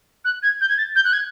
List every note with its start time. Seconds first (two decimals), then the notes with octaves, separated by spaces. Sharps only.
0.25 F#6
0.42 G#6
0.61 G6
0.69 G#6
0.78 A6
0.95 G6
1.05 F#6
1.13 G#6